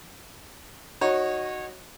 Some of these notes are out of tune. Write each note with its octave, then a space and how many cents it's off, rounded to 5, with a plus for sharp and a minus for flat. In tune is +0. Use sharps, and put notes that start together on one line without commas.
D#4 -15 F#4 +0 C#5 -25